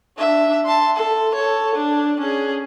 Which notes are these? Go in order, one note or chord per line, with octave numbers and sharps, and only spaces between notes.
D4 E5
A5 C6
A4
A4 C#5
D4
C#4 G#4